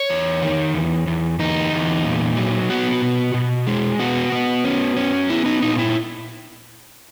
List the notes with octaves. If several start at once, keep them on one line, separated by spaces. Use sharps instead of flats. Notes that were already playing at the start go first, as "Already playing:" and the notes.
Already playing: C#5
E2
D#3
E2
E2
E2 D#4
E2
A#2
F#3
B3 F#4
B2
B2
G#3
B3 F#4
B3
C#4
C#4
B3 E4
D#4
A#2 D#4
E4